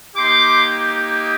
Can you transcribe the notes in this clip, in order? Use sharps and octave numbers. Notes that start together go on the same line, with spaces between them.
A#3 D#4 G4 C6 D6